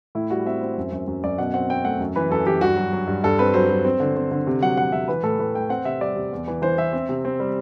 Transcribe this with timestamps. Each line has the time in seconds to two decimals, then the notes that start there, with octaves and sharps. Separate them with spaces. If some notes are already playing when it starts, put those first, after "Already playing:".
0.15 A2 E4
0.30 G3 F#4
0.46 C4 E5
0.62 C4
0.77 F#2
0.92 F#2
1.08 F#2
1.23 F#2 D5
1.38 B2 F#5
1.54 C4 F#5
1.70 C4 G5
1.84 A3 F#5
2.00 F#2
2.16 E3 B4
2.30 F#2 A4
2.46 E3 G4
2.61 G2 F#4
2.77 F#3
2.93 F#3
3.07 G2
3.24 G2 A4
3.39 C4 B4
3.54 F#3 C5
3.70 F#3
3.85 C4
4.00 D3
4.16 C4
4.31 D3
4.47 C3
4.62 F#3 F#5
4.77 F#3 F#5
4.92 C3 E5
5.08 E3 B4
5.23 A2 A4
5.39 A2 B4
5.55 A3 G5
5.69 C4 F#5
5.85 C3 E5
6.01 G3 D5
6.16 C3
6.32 E2
6.48 E3
6.62 E3 C5
6.78 E3 E5
6.93 C4
7.09 C3
7.25 C4
7.40 G3